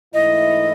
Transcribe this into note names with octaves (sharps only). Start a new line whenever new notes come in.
G#2 E3 A3 E4 D#5